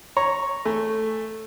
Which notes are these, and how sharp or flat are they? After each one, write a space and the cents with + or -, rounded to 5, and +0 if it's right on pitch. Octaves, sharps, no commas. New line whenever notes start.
C#5 -5 A#5 +0
A3 +0 G#5 -15